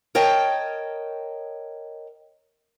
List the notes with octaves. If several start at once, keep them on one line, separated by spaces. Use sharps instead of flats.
A#4 C#5 D#5 G5 A5